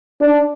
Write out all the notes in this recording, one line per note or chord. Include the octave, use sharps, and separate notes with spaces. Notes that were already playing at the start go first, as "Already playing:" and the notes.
D4